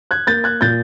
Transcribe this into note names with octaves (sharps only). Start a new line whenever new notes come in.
F#6 G#6
A#3 G6 A6
F#6 G#6
A#2 G6 A6